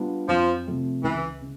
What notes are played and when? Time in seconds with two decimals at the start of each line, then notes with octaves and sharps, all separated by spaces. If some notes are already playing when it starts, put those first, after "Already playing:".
Already playing: G3 B3 D4 F4
0.28 F2 F3
0.67 C3 F3 A3 C4
1.03 C#2 E3
1.41 C#3